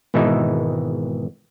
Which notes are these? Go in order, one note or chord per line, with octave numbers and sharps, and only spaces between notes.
G#1 B2 E3 G#3 D#4 E5